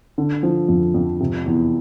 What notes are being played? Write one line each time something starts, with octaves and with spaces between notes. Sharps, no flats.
D3
F3
F2
F2
C3
E2